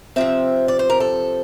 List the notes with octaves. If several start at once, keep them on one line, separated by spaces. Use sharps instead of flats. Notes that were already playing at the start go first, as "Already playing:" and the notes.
C3 F3 C4 E5
D5
C5
A#4
A4